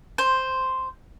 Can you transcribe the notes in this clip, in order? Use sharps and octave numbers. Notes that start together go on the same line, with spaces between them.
C5